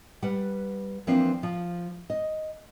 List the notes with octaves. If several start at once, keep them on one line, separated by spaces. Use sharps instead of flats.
G3 B4 F#5
E3 F3 A#3 C4 D4
F3
D#5